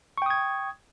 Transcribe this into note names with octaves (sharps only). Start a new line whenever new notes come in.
G5 C#6 D#6 G#6